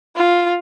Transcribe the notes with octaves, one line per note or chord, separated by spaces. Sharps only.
F4